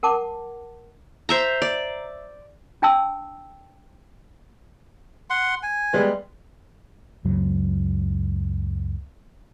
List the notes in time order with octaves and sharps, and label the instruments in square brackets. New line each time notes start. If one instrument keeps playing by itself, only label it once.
[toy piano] A#4 F#5 A5 D6
[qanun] C5 E5 A#5
D5
[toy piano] D4 G5 A5 E6
[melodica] F#5 C6
G#5
[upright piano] G3 G#3 B3
[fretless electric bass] C#2 F#2 C#3 F#3